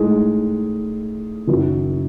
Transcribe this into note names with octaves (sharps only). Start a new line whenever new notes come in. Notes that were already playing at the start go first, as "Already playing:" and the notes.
Already playing: A2 G#3 D#4 G#4
F#1 F#2 D#3 F#3